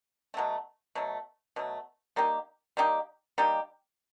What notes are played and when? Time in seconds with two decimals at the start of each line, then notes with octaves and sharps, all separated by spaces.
0.34 B2 F#3 A3
0.95 B2 F#3 A3
1.56 B2 F#3 A3
2.16 G3 A#3 D#4 G4
2.77 G3 A#3 D#4 G4
3.38 G3 A#3 D#4 G4